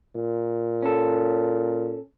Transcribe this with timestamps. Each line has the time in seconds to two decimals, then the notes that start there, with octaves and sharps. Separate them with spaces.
0.16 A#2
0.83 C#4 A4